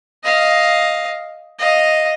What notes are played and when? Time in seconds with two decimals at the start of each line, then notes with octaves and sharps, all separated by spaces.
0.24 D#5 F5
1.59 D#5 F5